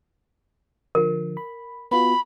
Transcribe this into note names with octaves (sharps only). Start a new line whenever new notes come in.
D3 F3 A#4
B5
B3 F4 F#4 B5